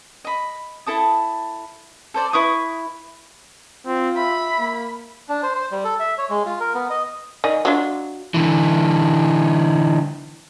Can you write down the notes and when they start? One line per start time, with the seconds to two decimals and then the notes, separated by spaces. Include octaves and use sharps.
0.25 D#5 B5
0.86 E4 A4 A5 D#6
2.14 A4 C5 D5
2.33 E4 B4 C#6 D#6
3.86 C4 F4
4.17 E5 B5
4.58 A#3
5.29 D4
5.43 C5
5.55 C5
5.71 G3
5.84 A4
6.00 E5
6.18 C#5
6.30 G#3
6.46 F4
6.60 A#4
6.75 B3
6.90 D#5
7.44 D#3 D5 D#5 G#5
7.65 F#3 D4 F4
8.34 D3 E3